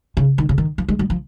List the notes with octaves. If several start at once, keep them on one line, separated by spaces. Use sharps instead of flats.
C#3
D#3
C#3
D#3
F3
G#3
F#3
F3